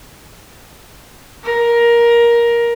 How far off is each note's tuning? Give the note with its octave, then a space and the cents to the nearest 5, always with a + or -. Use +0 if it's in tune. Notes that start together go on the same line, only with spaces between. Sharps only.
A#4 +15